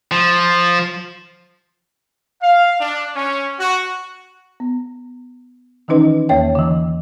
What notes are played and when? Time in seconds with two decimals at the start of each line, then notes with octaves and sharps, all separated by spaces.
0.11 F3
2.42 F5
2.80 D4
3.16 C#4
3.60 F#4
4.60 B3
5.88 D#3 E3 C#4 D#4 B4 D#5
6.29 E2 A#3 C#5 G5
6.55 D3 E3